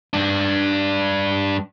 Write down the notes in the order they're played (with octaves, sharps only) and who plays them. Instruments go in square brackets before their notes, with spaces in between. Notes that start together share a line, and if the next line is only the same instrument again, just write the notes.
[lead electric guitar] G2 D4